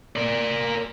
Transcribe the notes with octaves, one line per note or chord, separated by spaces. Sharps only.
A#4 D5